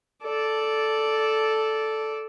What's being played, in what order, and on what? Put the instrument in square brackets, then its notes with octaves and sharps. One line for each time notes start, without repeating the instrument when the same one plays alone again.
[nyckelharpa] A4 D5